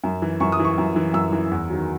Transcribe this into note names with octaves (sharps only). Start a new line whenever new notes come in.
F#2
E3
F#2 C#6
D#6
E3
C#6
F#2
E3
F#2 E6
E3
E2
D#3 F#3